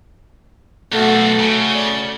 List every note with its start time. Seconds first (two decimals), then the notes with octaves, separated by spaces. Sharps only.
0.92 B1 A3 F#4
1.40 C#3
1.73 D5